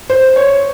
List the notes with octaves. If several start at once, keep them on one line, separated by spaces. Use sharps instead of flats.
C5
C#5